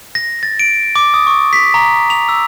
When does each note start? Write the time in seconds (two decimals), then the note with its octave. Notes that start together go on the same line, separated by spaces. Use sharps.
0.15 A#6
0.43 A6
0.59 D7
0.96 D6
1.14 D#6
1.27 C#6
1.53 B6
1.74 A#5
2.10 F7
2.29 E6